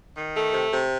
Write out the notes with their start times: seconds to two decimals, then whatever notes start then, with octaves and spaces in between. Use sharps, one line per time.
0.16 D#3
0.35 A3
0.54 C3
0.73 C3